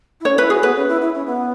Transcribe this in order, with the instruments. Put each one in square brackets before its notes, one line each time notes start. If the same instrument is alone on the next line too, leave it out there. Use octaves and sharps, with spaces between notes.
[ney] E4
[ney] C#4 [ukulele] C#5
[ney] E4 [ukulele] B4
[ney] F#4 [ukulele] G#4
[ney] B3 [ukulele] B4
[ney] C#4
E4
E4
C#4
B3